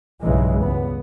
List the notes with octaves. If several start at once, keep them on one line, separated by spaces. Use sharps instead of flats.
B1 G2 C#3 E3 G#3
C#2 B3